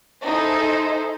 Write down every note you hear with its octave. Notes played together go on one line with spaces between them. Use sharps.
D#4 E4 G#4 A4 C5